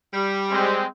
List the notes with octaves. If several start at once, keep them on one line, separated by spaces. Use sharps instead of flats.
G3
G#3 C4